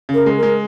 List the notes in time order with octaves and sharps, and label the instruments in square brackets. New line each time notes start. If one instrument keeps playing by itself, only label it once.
[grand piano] C#3
[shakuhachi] A#4
[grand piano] G#3
[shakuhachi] A#4
[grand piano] G#3